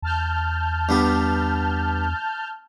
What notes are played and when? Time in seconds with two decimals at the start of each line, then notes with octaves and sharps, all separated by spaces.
0.02 E2 A5 F6 G6
0.89 G2 B3 G4